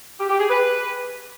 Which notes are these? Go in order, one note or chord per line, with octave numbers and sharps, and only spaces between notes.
G4
G4
G#4
B4